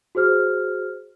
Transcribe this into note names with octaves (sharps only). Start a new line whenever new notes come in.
F#4 G#4 C5 F6